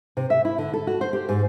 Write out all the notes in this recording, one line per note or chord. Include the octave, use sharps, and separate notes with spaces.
C3
E5
E4
D3
A4
F#4
C5
G4
G#2